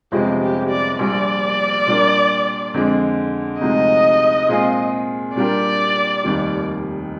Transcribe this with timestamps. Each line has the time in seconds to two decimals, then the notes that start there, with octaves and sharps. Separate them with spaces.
0.12 G1 F2 C3 F3 G#3 G4
0.41 G4
0.70 D5
0.99 A#1 A#2 G3 D5
1.87 A#2 G3 D4 G4 A#4
2.74 F2 D3 G#3
3.61 D2 C3 F3 G#3 D#4 D#5
4.48 A#2 G#3 C4 F4 G#4
5.36 A#2 G3 D4 G4 A#4 D5
6.24 F1 D#2 D#3 G3